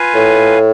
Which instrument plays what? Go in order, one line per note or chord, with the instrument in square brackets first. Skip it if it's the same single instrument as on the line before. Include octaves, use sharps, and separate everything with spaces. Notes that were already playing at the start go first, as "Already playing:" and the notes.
Already playing: [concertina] F4 B4 F5 G#5
[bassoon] A2